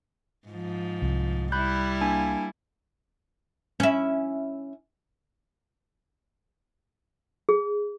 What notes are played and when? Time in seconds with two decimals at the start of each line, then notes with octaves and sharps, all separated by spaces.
0.48 G#2 F3
1.02 C2
1.52 G3 E4 B5 F#6 G6
2.01 A#3 D4 G#5
3.80 C#4 E4
7.49 G#4